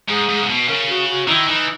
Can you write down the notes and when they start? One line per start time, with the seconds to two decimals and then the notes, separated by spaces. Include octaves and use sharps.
0.09 G#2 G#4
0.29 G#2
0.42 C#3
0.49 B2
0.68 C#3 A#4
0.89 F#4
1.09 F#4
1.28 D#3 E4
1.48 E3 D#4